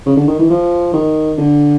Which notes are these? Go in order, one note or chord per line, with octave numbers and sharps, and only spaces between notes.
C#3
D3
D#3
E3
F3
D#3
D3